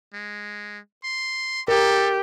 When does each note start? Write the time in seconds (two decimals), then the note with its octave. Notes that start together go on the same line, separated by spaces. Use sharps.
0.14 G#3
1.04 C6
1.68 G4 A4 A#4